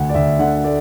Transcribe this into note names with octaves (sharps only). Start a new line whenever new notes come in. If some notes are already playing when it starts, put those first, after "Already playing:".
Already playing: D2 F#5
D5
D2 E5
D3 F#5
A3 D5